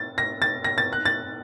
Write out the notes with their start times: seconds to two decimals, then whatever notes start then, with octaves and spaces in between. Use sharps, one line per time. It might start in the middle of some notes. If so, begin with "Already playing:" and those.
Already playing: A6
0.18 A#6
0.42 A6
0.64 A#6
0.78 A6
0.93 F#6
1.05 A6